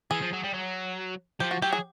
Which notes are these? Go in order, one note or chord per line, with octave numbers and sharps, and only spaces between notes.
E3 G#4
F3
F#3
G3
F#3
F3 G4
F#4
F#3 G4
G#4